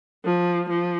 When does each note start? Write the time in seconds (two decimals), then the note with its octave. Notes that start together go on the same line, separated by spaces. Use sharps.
0.25 F3
0.70 F3